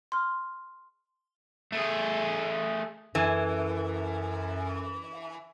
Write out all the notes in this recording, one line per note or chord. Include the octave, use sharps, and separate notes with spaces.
C6 F6
A3 G#4
F#2 E3 A4 G#5